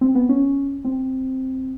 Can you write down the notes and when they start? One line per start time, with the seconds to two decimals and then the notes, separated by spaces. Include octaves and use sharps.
0.01 C4
0.15 B3
0.29 C#4
0.85 C4